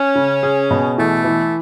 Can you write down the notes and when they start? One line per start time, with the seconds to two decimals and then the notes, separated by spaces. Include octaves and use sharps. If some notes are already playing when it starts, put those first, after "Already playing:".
Already playing: C#4
0.15 C#3
0.43 G#4
0.71 B2
0.98 E3 A3
1.24 E3